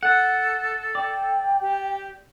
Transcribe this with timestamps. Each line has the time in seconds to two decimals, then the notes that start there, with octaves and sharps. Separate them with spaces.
0.03 A4 F#5
0.95 D5 G5
1.61 G4